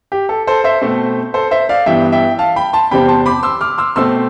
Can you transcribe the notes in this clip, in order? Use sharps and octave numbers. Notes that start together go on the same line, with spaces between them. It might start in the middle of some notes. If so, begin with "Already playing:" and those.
G4
A4
A4 C5
C5 E5
B2 A3 C4
A4 C5
C5 E5
D5 F5
G2 E3 B3 E5 G5
E5 G5
F5 A5
G5 B5
A5 C6
E2 C3 G3 C4 G5 B5
A5 C6
B5 D6
C6 E6
D6 F6
C6 E6
B2 A3 C4 C6 E6